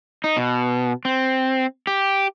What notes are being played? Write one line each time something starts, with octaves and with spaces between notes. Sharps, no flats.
D#4
B2
C4
G4